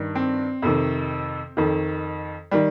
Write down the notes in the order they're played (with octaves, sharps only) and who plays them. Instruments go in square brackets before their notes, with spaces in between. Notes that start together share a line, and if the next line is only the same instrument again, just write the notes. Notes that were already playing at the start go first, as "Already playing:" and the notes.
Already playing: [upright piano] G2 D#3
C4
F2 C3 D#3
F2 D#3
D#3 G3